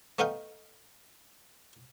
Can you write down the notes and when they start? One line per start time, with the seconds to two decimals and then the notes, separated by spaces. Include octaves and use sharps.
0.19 A3 B3 D#4 F5 G5